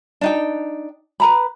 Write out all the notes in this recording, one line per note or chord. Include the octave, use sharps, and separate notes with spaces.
D4 D#4 G5
B4 A#5 B5